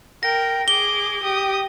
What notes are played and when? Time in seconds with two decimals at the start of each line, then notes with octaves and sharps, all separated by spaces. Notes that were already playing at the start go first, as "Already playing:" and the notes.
0.23 A#4 G5 A#6
0.68 G#4 D6 G7
1.23 G4 D#6